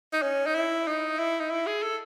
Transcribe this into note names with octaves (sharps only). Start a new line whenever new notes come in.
D#4
C#4
D#4
E4
D#4
E4
D#4
E4
G#4
A4